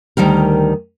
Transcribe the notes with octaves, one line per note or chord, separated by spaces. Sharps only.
D2 D#3 G3 A#4